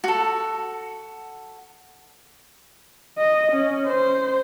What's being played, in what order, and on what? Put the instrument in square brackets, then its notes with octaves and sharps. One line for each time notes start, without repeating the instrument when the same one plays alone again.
[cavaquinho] F#4 A4
[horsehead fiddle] D#5
C#4
C5